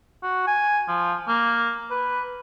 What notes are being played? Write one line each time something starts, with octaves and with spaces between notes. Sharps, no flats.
F#4
G#5
F3
A#3
B4